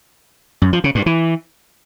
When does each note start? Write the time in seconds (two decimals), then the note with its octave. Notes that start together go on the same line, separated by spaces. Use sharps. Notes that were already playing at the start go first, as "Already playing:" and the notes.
0.62 F#2
0.73 F3
0.84 C#3
0.95 G2
1.06 E3